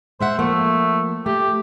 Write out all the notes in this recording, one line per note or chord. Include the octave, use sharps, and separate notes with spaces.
G#3 C5 E5 F#5
F3 A3 A#3
A3 G4